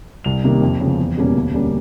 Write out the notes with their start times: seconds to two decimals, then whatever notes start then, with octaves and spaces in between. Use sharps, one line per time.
0.24 C2 F7
0.43 C3 D#3 G3 A#3
0.62 F2
0.80 C#3 F3 G#3 B3
0.99 E2
1.17 B2 G3 A#3 C#4
1.35 D2
1.54 D3 G3 A#3 C#4